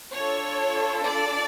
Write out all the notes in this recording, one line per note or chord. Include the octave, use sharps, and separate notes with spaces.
D4 F4 A4 C#5
D5